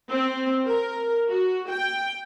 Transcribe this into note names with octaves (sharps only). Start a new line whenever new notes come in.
C4
A#4
F#4
G5